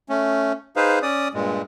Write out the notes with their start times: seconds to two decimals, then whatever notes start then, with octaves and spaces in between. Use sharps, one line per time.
0.09 A3 C#4
0.76 D#4 G#4 B4 C5 F5
1.02 C#4 D5 D#6
1.34 G2 A#2 G#3